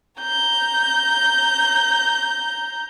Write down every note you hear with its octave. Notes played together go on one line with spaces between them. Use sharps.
A#5 G6